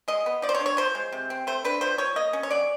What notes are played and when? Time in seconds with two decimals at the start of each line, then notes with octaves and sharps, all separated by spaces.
0.08 G#3 D#5
0.26 B3
0.42 F3 D5
0.49 C5
0.55 C#5
0.60 D4
0.66 C#5
0.77 F3 C5
0.95 G#3
1.12 C3
1.30 C4
1.47 A3 C5
1.64 D4 B4
1.81 F3 C5
1.98 F3 C#5
2.16 A#3 D#5
2.33 C#4
2.43 C#5
2.50 F#3 D5